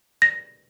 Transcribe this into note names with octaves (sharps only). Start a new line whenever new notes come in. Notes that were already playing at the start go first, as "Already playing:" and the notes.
A#6